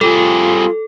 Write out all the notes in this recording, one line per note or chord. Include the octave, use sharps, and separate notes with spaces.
G3 C4 F4 G#4 A4